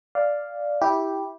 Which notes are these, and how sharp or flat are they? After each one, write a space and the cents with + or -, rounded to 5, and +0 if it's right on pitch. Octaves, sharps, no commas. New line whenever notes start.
D5 +0 F5 +0
E4 -15 G4 +0